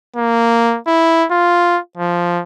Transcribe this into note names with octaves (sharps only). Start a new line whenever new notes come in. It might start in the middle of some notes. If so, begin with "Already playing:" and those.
A#3
E4
F4
F3